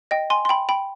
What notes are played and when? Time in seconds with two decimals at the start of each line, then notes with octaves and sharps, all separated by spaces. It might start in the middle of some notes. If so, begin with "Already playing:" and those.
0.11 D#5 G5
0.30 G#5 C6
0.45 C6
0.49 G5 B5
0.69 G5 B5